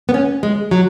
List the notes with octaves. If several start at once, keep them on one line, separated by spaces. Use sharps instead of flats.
B3
C#4
G#3
F#3